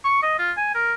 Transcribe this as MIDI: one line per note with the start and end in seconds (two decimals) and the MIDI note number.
0.05 0.20 85
0.23 0.35 75
0.39 0.51 65
0.57 0.70 80
0.75 0.95 70